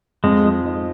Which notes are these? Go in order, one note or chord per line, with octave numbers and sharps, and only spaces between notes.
F2 G#3
F3
D#4